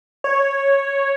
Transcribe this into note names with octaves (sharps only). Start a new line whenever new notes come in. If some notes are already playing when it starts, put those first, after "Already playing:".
C#5